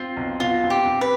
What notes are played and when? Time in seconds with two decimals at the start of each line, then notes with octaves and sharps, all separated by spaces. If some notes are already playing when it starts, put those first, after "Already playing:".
Already playing: C4 F4
0.17 B1
0.40 B2 F4
0.64 C4
0.70 G4
0.86 C4
1.01 B4